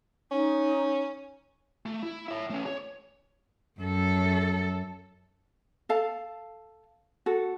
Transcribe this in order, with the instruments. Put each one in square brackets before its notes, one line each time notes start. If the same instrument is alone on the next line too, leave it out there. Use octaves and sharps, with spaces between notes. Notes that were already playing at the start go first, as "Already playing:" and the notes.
[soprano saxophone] C#4 [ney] D#4
[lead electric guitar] A3
E4
C#5 E5
A3 C#4
C#5
[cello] F#2 A4
[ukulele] A4 F5 A5
F#4 A4